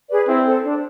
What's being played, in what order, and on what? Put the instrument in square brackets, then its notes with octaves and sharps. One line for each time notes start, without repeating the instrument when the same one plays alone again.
[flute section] G#4 B4 D5
[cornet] C4 [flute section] E4
[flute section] A4 C5
D4